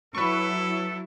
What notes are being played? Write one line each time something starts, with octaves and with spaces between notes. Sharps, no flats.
F#3 E4 A4 B4 C#6